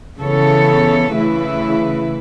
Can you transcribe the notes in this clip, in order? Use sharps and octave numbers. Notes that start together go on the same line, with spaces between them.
C#3 E3 B3 A4 C#5
C#3 E3 A3 E4 B4